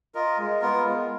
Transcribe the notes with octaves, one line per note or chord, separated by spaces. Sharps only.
F4 A#4 D#5
G#3
B3 F4 A#4
G#3